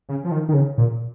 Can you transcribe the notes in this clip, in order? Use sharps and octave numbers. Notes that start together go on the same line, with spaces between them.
C#3
F3
D#3
D#3
C#3
A#2